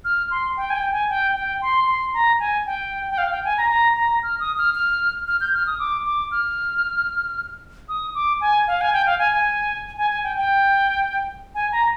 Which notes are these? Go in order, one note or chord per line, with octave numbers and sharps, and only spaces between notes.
F6
C6
G5
G#5
G5
G#5
G5
G5
C6
C6
A#5
G#5
G5
G5
F5
G5
G#5
A#5
A#5
A#5
F6
D#6
F6
F6
F6
G6
F6
D#6
D6
D6
F6
D#6
D6
G#5
F5
G#5
G5
F5
G#5
G#5
G#5
G#5
G5
G5
G#5
A#5